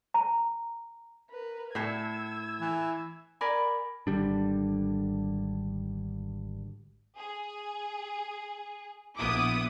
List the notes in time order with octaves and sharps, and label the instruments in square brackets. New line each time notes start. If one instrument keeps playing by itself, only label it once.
[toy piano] A#5
[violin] A#4 B4
[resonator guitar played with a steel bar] A2 A4 [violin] E6 G#6
[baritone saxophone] E3
[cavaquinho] A#4 D5 G#5 B5
[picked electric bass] G#1 D3 G3 D4
[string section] G#4
A#1 B3 E4 D6 D#6